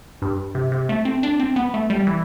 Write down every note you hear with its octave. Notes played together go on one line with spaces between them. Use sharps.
G2
C3
C3
A3
C4
D4
C4
B3
A3
G3
E3